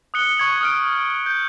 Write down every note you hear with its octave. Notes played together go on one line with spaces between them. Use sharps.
D#6 F#6 C#7 G7
C#6 G#6 F#7
D#6 F6 D7
G6